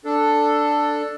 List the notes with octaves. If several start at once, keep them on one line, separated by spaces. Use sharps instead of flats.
D4 A4